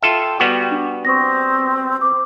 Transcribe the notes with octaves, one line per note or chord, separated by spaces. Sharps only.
F4 A4 E5 G5
G3 B3 F#4
D4
C4 C#6 D#6 A#6
C5 D6